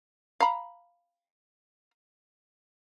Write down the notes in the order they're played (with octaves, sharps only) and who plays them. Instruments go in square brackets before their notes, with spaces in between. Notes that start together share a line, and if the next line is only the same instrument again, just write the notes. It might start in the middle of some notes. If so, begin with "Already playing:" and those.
[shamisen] F5 A#5 B5